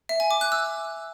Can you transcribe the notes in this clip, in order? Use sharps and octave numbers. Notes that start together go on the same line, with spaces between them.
E5
G#5
D6
F#6
E6